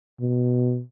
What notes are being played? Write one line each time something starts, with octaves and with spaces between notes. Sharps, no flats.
B2